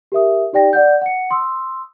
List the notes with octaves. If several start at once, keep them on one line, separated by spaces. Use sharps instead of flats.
G4 A#4 E5 D#6
D#4 G4 D5 G5 A#6
D5 F#5 G6
F#5 C#7
C6 D#6 E6